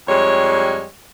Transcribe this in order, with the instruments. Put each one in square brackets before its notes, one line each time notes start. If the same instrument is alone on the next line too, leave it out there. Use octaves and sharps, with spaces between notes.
[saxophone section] F2 G3 G#3 C#5